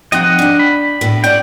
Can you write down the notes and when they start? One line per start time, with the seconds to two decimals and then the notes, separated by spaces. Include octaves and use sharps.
0.12 F3 C4 D#4 D#5 F#5
0.39 D4 G5
0.59 B5
1.01 A2 B3
1.24 C#5 D5 F#5 G5